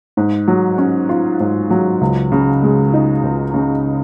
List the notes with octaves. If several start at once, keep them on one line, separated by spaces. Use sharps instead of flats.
G#2
F#3
C#4
F4
G#2
F#3
C#2
C#3
G#3
D#4
C#2
C#3